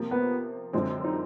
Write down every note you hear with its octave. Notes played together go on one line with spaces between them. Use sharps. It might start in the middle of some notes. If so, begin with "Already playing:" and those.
Already playing: C3 F3 A#3
B3
F#2 D3 F3 G#3 C4
D#4